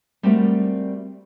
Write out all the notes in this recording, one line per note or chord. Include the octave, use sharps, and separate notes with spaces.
G3 A3 C4 F#4 G4 A#4